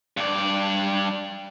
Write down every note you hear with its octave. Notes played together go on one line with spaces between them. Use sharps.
G2 D5